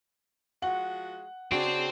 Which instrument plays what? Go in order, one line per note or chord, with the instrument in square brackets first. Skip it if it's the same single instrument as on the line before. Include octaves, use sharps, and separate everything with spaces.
[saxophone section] F3 G#3 F#4 [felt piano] F#5
[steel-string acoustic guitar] C#3 D4 F#4 [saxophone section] G#4 D5 [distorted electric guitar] C5 G5